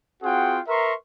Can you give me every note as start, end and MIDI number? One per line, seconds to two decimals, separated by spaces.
0.23 0.59 60
0.23 0.59 65
0.23 0.59 66
0.23 0.59 68
0.23 0.59 78
0.23 0.59 79
0.68 0.94 70
0.68 0.94 71
0.68 0.94 76
0.68 0.94 82
0.68 0.94 84
0.68 0.94 85